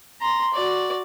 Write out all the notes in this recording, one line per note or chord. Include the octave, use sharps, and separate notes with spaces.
A#5 C6
F#4 D5